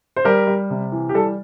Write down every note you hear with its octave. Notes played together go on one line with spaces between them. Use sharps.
C5
G3 G4 A#4
G3
C3
E3
G4
G3 A4